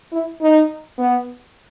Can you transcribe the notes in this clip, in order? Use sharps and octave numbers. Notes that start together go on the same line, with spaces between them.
E4
D#4
B3